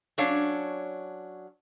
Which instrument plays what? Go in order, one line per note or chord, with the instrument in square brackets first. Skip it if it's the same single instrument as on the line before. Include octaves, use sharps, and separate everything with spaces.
[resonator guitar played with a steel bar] F#3 C#4 D4 C#5 F5